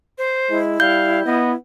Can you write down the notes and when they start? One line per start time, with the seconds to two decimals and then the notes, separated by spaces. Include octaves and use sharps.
0.18 C5
0.50 G#3 E4
0.80 G3 F5 G6
1.26 B3 D#5